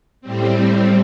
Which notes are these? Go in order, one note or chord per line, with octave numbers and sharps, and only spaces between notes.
A2 G3 C4